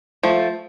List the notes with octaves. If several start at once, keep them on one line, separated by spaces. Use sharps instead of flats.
F3 A3